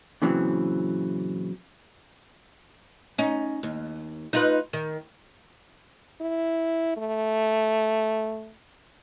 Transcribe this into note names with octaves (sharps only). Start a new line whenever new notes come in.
A#2 C#3 E3 F#3 C4
C#4 D#4
D#2
D#4 F4 B4
D#3
E4
A3